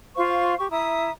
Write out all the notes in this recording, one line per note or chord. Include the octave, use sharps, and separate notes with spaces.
F4 C5 F5 C#6
G4 C#6
E4 E5 A#5 D#6